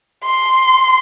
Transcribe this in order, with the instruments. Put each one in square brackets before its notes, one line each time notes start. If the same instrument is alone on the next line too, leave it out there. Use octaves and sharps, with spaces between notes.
[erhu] C6